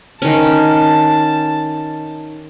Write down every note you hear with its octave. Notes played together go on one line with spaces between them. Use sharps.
D#3 C#4 A5